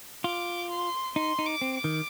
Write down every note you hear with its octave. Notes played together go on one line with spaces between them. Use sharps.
F4 D6
C6
D#4 C6
D#4
D6
C4
D6
D#3